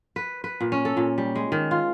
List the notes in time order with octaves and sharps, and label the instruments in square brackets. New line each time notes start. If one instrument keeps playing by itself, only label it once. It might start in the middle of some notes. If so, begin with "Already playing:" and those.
[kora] B4
B4
A#2
C#4
A4
A#2
G3
G#3
D#3
F4